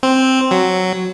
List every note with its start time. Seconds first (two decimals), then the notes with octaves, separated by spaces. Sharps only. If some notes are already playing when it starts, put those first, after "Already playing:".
0.03 C4
0.51 F#3